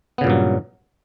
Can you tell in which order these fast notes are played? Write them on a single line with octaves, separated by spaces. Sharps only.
B3 C#3 A#2 G2 F#3